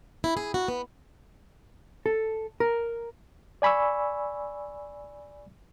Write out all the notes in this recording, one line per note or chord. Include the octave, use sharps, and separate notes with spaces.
E4
G#4
F#4
B3
A4
A#4
D5 G#5 B5 C#6 E6